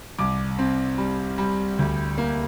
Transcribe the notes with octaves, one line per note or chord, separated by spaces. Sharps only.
C2 D6
C4
G3
G3
D2
A#3